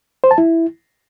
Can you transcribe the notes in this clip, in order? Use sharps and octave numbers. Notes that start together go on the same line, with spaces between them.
C5
A5
E4